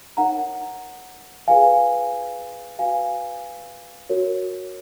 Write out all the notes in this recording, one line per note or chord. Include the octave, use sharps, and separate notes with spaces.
D#4 A#4 C#5 F#5 A#5
F4 G#4 B4 F5 G#5
F#4 B4 F5 G#5
F#4 A#4 C#5